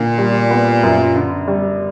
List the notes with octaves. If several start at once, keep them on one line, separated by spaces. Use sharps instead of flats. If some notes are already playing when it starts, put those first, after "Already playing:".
Already playing: A#2 D3
G3
B3
F#2
D3
G3